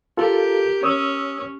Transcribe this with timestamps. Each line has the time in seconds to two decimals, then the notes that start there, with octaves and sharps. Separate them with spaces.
0.17 F4 G4 A4 A#4
0.83 C#4 C#5 D#6 E6